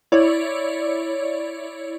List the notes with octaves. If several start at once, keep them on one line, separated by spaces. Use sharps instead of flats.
E4 C#5 D5